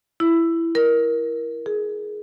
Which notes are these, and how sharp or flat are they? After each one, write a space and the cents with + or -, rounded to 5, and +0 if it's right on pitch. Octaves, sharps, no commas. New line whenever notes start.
E4 +10
A#4 +15
G#4 +20